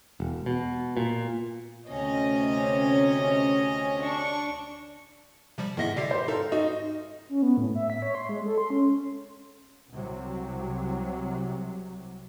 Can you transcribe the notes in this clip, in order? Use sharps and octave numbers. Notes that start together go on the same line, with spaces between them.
E1
B2
A#2
D2 C3 C#4 D#5
D4 C#6
C3 F3 G3
E2 G#2 D#3 G#3 D#5 E5 A#6 C#7
B2 D3 G4 D5 E5 C7 D7
B4 C5
D#4 A4 F5 G5
D#4 F#4
C#4
B3
A2
E5
B6
C#5
C6
G#3
A4
C6
C#4
C2 C3 F#3